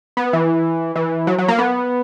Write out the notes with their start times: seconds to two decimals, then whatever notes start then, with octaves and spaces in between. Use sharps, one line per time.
0.17 B3
0.33 E3
0.96 E3
1.27 F#3
1.38 F#3
1.48 A#3
1.58 B3